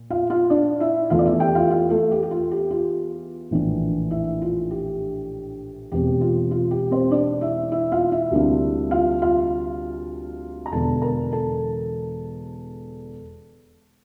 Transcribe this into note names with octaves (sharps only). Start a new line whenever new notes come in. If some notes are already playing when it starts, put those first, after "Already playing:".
Already playing: A#2
F4 F5
F4 F5
D4 D5
E4 E5
E2 E3 A3 E4 F4 F5
D5
E4 E5
G4 G5
F4 F5
F4 F5
A3 A4
G4
G4
F4
G4
F4
A#1 A2 E3 A#3 D4
E4 E5
F4
G4
E1 E2 C3 G4
F4
F4
G4
C4 C5
D4 D5
E4 E5
E4 E5
F4 F5
E4 E5
D2 C3 G3 A#3 D4
F4 F5
F4 F5
A#5
E1 E2 D3 A4 A5
A#4 A#5
A4 A5